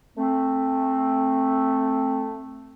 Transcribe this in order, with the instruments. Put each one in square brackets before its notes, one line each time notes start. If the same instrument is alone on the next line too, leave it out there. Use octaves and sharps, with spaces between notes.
[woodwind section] A3 C4